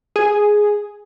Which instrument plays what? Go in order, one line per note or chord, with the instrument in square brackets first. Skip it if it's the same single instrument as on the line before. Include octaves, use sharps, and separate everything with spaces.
[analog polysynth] G#4